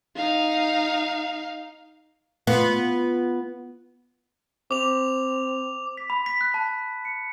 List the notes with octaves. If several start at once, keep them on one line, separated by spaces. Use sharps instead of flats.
D#4 F5
B3 F4
C4 D6 F7
B6
B5
B6
F#6
A5
C#7